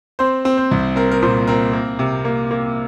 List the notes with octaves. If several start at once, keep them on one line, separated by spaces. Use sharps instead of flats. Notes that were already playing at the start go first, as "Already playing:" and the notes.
C4 C5
C4
C5
C2
C4 A#4
A#4
A#2 C5
C4 A#4
A#3
C3
A#3
A#3